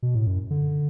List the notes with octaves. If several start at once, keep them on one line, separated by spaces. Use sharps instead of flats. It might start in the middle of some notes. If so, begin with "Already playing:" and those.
B2
A2
F#2
D3